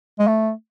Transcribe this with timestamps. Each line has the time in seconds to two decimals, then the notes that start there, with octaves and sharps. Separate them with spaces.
0.19 G#3
0.27 A3